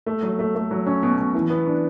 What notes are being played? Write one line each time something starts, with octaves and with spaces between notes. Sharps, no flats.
A3
F#3
A3
A3
F#3
C#4
B2
B2
E3
B3
D4